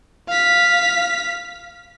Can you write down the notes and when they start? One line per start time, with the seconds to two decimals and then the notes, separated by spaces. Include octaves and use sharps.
0.28 F5 B6